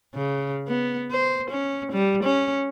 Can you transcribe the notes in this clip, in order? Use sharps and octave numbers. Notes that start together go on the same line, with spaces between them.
C#3
B3
C5
C#4
G3
C#4